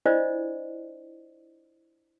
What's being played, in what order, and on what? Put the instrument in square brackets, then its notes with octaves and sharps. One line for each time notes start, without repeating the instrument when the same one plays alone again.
[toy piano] D4 E4 F4 C5 D5 D#5